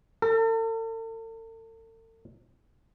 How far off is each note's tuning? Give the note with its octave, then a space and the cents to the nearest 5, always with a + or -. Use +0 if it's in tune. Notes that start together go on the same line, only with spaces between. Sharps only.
A4 +40